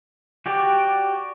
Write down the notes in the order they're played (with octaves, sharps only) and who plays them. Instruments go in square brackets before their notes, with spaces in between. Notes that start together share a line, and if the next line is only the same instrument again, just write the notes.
[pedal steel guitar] F#4 G4 D5